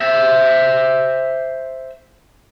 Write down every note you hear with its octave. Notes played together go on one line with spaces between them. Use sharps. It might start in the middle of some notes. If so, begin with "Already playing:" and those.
C5 E5